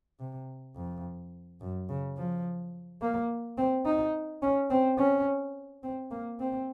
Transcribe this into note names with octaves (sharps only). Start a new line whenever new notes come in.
C3
F2
F#2
C#3
F3
A#3
C4
D#4
C#4
C4
C#4
C4
A#3
C4